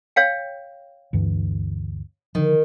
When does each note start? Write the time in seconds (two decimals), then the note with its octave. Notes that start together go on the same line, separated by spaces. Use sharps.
0.16 C#5 F5 G5
1.13 D2 G2 E3
2.35 D3 D#3 F3